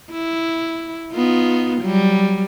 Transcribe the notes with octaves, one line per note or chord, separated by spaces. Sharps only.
E4
B3 D#4 F4
F#3 G3